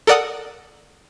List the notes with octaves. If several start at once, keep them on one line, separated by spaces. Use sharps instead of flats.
A4 A#4 D5 F#5 D#6